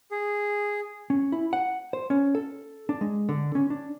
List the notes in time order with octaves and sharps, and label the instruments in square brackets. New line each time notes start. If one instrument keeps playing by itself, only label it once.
[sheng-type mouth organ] G#4
[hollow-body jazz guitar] C#4
E4
F#5
C5
C#4
A4
D4
G#3
D3
C#4
D4